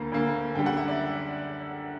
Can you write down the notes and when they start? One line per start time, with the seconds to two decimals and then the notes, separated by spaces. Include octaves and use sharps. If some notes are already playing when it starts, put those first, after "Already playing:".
Already playing: D2 D3 A#3 A#5
0.12 D2 D3 A#3
0.55 F#2 D3 G3 G5
0.66 F#5
0.77 E5
0.88 D5